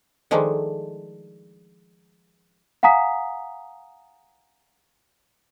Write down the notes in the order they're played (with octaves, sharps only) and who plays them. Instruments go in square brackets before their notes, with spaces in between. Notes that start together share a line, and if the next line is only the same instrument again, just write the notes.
[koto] D#3 F3 G#3 A3 D4
[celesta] F5 F#5 G#5 A#5 D#6 B6